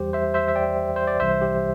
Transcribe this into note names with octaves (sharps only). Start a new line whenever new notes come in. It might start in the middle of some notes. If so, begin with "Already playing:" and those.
Already playing: E2 E3 G3 G4 C5
C5 E5
C5 E5
E5
D5 G5
C5
D5
C2 C3 E3 G3 C5 E5
G4